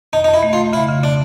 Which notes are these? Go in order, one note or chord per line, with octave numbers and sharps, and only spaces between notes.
F2 D#4
D#4
F2
E4
A3
F4
A3
C#3 E4
C#3
D4